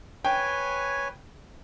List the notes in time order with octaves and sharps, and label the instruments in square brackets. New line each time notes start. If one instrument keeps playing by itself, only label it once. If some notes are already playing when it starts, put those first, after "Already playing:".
[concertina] B4 C#5 G#5 [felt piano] G5